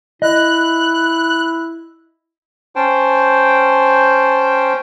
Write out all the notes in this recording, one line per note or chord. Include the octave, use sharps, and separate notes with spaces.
E4 D#5 F#6
C#4 C5 G5 A5